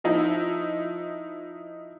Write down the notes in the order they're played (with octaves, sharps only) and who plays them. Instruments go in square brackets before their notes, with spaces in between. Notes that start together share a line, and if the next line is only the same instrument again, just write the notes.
[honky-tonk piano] F3 D#4 E4